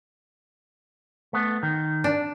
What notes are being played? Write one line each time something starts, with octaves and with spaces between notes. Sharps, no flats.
A3 B3
D#3
D4